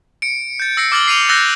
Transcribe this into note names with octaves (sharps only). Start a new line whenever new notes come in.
C#7 D7
G6 A6
E6 A#6 C7 C#7
D6 F6 A6 F#7 G7
C7 D#7 F7
E6 F#6 G6 A6 A#6